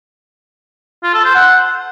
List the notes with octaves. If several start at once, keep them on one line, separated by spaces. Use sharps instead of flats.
F4
A4
C5
F#5